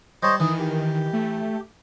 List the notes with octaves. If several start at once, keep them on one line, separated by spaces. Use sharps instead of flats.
G3 C5 C#5 D#5 A5
D#3 E3 D#6
G4
A3